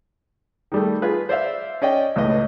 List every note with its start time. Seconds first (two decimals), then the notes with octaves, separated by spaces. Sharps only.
0.72 D#3 G3 A3
1.02 F4 G#4 B4
1.29 C5 D5 E5 F5
1.82 C#4 D5 D#5 G5
2.16 C#2 A2 B4 D#5